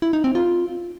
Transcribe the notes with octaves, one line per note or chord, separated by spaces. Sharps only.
E4
D#4
C4
F4